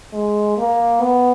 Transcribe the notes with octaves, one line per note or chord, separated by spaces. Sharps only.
G#3
A#3
B3